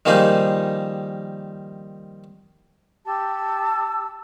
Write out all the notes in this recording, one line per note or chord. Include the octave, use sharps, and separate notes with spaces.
D#3 F3 G3 A#3 D#4 G#4
G4 A5 E6